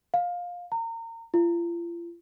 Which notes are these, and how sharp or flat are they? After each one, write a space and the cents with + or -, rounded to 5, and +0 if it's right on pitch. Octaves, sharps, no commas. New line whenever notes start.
F5 +20
A#5 -30
F4 -40